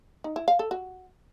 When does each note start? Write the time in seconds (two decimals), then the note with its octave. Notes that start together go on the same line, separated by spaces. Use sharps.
0.24 D#4
0.36 E4
0.48 F5
0.59 A4
0.71 F#4